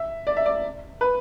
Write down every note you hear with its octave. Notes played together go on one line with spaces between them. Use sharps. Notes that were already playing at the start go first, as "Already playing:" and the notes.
Already playing: E5
D5
E5
D5
B4